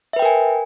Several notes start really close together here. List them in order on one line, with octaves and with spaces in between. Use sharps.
E5 B4 G5 A#4 G#5